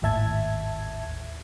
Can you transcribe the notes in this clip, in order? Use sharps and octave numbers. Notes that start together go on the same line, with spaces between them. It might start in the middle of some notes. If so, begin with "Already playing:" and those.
G#1 D#2 A2 E5 A5 G#6